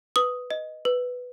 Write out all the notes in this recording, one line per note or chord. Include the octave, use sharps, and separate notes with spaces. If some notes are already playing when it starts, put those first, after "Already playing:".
B4 D#6
D#5
B4